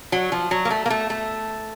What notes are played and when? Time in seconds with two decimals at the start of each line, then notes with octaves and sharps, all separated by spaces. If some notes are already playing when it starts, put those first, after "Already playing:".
0.12 F#3
0.32 F3
0.51 F#3
0.65 A#3
0.71 A3
0.86 A#3
0.90 A3
1.10 A3